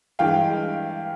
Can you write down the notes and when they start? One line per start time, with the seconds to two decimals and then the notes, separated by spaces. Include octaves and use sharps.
0.19 G2 E3 G#3 F5 G5